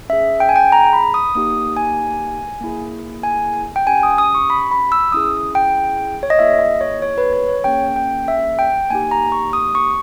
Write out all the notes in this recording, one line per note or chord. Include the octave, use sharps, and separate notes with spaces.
C#4 G#4 E5
G5
G#5
G5
A#5
B5
D#6
A#3 D#4 G4 D#6
G#5
A#3 E4 G#4
G#5
G5
C#4 G4 G#5
D#6
D#6
C#6
B5
B5
E6
C#4 E4 G#4 D#6
G5
C#5
D#5
A#3 E4 G#4 E5
D#5
C#5
C#5
B4
C#5
C#5
A#3 C#4 G#4 G5
G5
E5
G5
A#3 D#4 G4 G#5
A#5
C#6
D#6
C#6